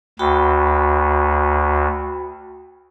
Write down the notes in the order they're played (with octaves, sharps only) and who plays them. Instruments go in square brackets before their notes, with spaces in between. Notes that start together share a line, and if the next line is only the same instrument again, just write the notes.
[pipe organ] D2 [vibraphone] F#4 G5 B5